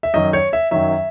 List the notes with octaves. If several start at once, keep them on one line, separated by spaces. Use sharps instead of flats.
E5
F#2 D#3 F#3 D#5
C#5
E5
F#2 D#3 F#3 E5